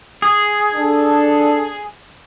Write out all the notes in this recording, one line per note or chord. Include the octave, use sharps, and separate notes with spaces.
G#4
D4 A4